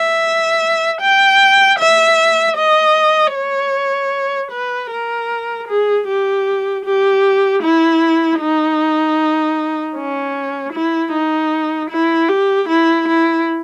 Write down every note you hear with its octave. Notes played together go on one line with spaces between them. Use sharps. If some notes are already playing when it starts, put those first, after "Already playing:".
Already playing: E5
G5
E5
D#5
C#5
B4
A#4
G#4
G4
G4
E4
D#4
C#4
E4
D#4
E4
G4
E4
E4